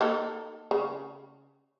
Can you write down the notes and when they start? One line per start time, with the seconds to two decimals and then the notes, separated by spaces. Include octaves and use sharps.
0.01 A#3 D#4 A4
0.71 C#3